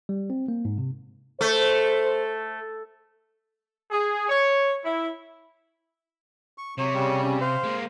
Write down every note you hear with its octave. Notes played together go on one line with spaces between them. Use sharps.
G3
C4
A#3
G#2
C3
A3 C5
G#4
C#5
E4
C#6
C3 F#3 C#5
C#3 G3
C#4
C5 F5
G#3 A#3